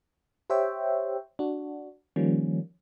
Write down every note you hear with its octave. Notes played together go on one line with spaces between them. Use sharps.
G4 C5 C#5 E5 G5
D4 F#4
D#3 F3 G3 A#3 C#4